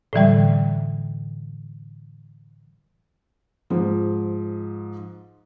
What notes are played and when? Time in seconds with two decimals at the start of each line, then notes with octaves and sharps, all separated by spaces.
0.13 A2 D3 E3 G3
3.70 G#2 F3